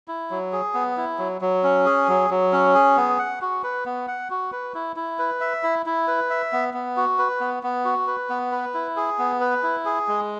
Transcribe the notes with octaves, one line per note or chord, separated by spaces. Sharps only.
E4
F#3
G#4
B3
E4
F#3
F#3
C#4
G#4
F#3
F#3
C#4
G#4
B3
F#5
F#4
B4
B3
F#5
F#4
B4
E4
E4
B4
E5
E4
E4
B4
E5
B3
B3
F#4
B4
B3
B3
F#4
B4
B3
B4
E4
G#4
B3
B4
E4
G#4
G#3